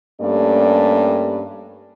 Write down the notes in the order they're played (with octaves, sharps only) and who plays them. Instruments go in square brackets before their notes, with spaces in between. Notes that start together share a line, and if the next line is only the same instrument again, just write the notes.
[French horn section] G2 A3 A#3 C#4 G4 D5